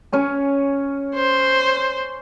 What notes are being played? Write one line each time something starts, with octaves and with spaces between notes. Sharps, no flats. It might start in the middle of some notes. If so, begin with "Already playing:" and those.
C#4 C#5 G#5
C5